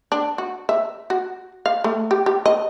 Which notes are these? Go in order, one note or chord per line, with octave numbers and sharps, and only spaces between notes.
D4
F#4
E5
F#4
F5
A3
G4
G4
D#5